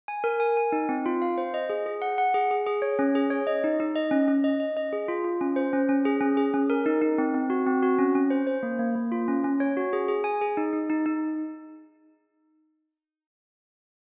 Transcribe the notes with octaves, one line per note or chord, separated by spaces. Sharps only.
G#5
A#4
G#5
G#5
D#4
C4
F4
F5
C5
D#5
G#4
G#4
F#5
F#5
G#4
G#4
G#4
C#5
C#4
G#4
C#5
D#5
D#4
D#4
D#5
C#4
C#4
D#5
D#5
D#5
G#4
F4
F4
C#4
C5
C#4
C#4
G#4
C#4
G#4
C#4
A#4
D#4
D#4
C4
C4
F#4
C4
F#4
C#4
C#4
C5
C5
A#3
A#3
A#3
F4
C#4
C#4
C#5
F#4
G#4
G#4
G#5
G#4
D#4
D#4
D#4
D#4